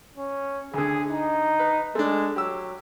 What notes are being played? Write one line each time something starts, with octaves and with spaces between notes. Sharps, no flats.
C#4
D2 D3 G#4
D#4
B4
G#3 A3 D4
F#3 G4 E6